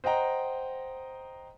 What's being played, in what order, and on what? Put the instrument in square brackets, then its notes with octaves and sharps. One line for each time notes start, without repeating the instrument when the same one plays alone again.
[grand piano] C5 D#5 F#5 G5 A#5